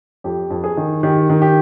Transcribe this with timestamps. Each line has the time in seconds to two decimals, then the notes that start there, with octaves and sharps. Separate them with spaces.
0.24 F2 G4
0.50 F2
0.64 G#4
0.77 D#3
1.03 D#3 G4
1.29 D#3
1.42 G4